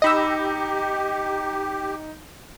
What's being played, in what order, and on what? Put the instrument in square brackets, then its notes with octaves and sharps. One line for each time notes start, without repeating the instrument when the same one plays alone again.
[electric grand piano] D#4 A#6 [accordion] G4 [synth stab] D#5 B5 E6